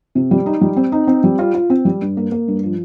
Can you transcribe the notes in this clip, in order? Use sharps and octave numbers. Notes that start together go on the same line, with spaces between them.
C3
G3
D#4
G3
C4
D#4
C4
G3
F4
F4
C4
G3
G2
A#3
A#3
G2
F3